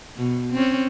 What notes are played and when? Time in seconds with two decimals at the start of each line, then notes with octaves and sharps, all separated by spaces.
0.17 B2
0.52 C4 C#4